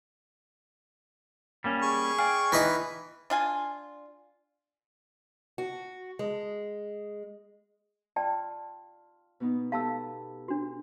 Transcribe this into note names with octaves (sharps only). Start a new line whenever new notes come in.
G3 A#3 C#4
G#4 C#6
D5 F5 G5 G#5
E3 D#4 B4
D4 F4 G#5
F#4
G#3
F4 D5 G5 A5
B2 B3 D#4
B3 G4 A4 F5 A5 E6
D4 F#4